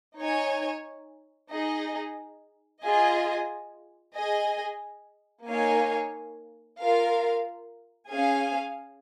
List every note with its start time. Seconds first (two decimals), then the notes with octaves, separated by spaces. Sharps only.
0.19 D#4 C#5 G#5
1.51 D#4 G#4 D#5
2.83 F4 G#4 D#5 G#5
4.15 G#4 D#5 G#5
5.46 A#3 D#4 C#5 F5 G#5
6.79 F4 A#4 F5
8.11 C#4 G#4 F5 G#5